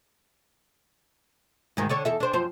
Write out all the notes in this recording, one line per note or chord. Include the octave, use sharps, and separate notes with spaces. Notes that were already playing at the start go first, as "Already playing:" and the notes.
D2 G#2 D#3
D3 A4 C#5
E2 A4 E5
D4 C5
F#2 F3 C5